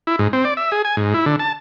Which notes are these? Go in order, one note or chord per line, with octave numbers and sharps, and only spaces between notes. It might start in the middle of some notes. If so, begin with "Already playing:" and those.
E4
G#2
C4
D5
E5
G#4
G#5
G#2
E4
D3
A5